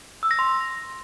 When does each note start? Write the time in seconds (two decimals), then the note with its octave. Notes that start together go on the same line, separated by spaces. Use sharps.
0.23 E6
0.31 A#6
0.39 C6